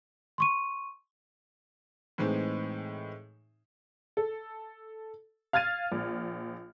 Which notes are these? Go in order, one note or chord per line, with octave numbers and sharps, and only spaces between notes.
C6 C#6 D#7
A2 E3 G#3 C4 D#4
A4
F5 F6 G#6 A6 D#7
A#1